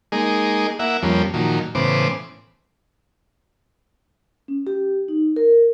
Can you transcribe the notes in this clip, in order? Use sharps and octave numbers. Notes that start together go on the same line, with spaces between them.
G#3 A#3 D#4 G#4
A#3 E4 E5 F#5
F2 F3 G3 A#3 C#4
A#2 D#3 F3 F#3
A2 C#3 E3 B3 C5 D6
C#4
G4
D#4
A#4